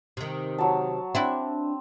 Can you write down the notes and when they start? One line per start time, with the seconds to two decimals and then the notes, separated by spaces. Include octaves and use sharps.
0.17 C3 D#3
0.58 F#3 A5
1.15 C4 D4 E4